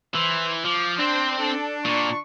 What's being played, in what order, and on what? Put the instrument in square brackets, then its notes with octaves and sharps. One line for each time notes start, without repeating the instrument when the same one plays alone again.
[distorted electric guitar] E3 [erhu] C5
[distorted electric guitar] F3 [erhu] D6
[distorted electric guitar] C4 [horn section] D4 [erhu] C5
[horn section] D4 [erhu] A4
[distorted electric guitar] A#2 [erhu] C#6